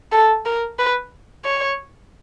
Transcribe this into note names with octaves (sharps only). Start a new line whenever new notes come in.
A4
A#4
B4
C#5